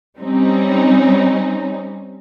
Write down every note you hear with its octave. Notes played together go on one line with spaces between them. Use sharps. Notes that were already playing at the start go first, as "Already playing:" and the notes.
G3 C4 C#4 D#4